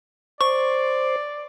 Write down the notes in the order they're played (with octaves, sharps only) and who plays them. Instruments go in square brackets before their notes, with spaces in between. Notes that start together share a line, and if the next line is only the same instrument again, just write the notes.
[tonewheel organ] C5 [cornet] D5 [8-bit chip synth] C#6